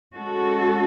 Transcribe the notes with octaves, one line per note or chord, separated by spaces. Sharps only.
G#3 C#4 F#4 A4